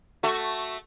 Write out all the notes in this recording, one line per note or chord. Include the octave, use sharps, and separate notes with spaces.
A3 F#4